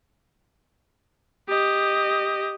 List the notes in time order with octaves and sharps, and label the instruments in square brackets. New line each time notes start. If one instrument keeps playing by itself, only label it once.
[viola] G4 D#5